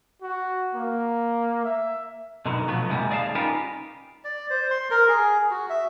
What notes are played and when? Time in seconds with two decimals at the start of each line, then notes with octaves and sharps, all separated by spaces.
0.22 F#4
0.75 A#3
1.64 E5
2.45 B2 D3 D#3 F#3
2.68 B2 F3 F#3 A3 B3
2.89 C3 F3 G3 G#3 A#3
3.10 D#2 G#4 D5 E5 F5 A5
3.35 C#4 D#4 F4 G4 A#4 B4
4.24 D5
4.50 C5
4.71 C6
4.91 A#4
5.08 G#4
5.51 F#4
5.70 E5